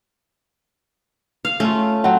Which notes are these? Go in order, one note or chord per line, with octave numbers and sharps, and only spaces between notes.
F5
A3 C#4 F4
F#3 C4 F#5